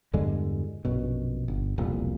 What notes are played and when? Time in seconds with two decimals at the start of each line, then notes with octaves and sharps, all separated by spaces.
0.13 E2 G2 D3 G#3
0.85 A#1 F#2 B2
1.48 G1
1.78 E1 C2 F2 A#2